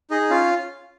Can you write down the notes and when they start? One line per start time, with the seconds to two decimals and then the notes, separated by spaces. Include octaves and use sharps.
0.10 D#4 G#4 D#5
0.30 C#4 F4 F5